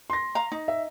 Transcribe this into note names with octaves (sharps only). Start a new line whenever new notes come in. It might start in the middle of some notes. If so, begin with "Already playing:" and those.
C6 A#6
F5 A#5
D#4
E5